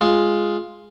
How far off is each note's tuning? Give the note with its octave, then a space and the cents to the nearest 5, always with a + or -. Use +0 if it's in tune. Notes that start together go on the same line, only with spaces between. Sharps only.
G#3 +0 F4 +0